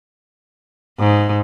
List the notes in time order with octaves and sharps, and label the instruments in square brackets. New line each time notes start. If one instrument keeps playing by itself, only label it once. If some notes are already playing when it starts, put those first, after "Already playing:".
[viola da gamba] G#2